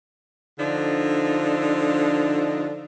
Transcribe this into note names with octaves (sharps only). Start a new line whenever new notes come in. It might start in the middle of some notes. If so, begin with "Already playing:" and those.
D3 F3 D4 D#4